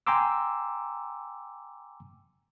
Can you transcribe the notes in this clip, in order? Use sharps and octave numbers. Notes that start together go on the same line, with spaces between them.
G5 G#5 A#5 C6 D6 E6